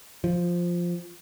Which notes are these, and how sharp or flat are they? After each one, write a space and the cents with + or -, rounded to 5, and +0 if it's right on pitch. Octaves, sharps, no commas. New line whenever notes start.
F3 +0